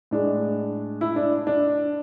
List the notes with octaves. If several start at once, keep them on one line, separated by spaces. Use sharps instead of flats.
A2 G#3 D4
E4
D4
D4